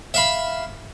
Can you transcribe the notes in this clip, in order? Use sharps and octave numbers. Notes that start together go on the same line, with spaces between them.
E5 F5 B5